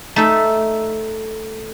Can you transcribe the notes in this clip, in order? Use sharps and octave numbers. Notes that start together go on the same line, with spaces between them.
A3 D#4 A4 E5